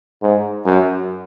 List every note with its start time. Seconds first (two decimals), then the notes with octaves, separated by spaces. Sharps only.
0.22 G#2
0.65 F#2